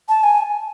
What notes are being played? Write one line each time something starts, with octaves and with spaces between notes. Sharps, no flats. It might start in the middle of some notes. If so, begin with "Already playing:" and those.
A5
G#5